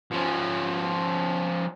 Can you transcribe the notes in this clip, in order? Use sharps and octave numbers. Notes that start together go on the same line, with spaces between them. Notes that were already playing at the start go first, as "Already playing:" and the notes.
F3 C#4